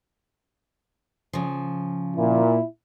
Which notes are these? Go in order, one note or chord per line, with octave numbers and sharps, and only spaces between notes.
C#3 F3
A#2 E4